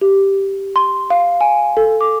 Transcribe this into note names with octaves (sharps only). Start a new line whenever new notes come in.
G4
C6
F5
G#5
A4
D6